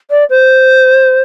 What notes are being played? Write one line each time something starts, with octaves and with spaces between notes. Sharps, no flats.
D5
C5